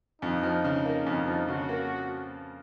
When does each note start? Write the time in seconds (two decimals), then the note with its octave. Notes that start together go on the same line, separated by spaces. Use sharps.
0.22 F2 D#4
0.43 F3
0.64 C#3
0.85 A#3
1.06 F2
1.27 F3
1.49 C#3 F#4
1.69 A#3